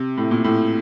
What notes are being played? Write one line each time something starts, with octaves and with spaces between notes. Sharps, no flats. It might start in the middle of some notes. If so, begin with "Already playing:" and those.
Already playing: C3
A2
A#2
A2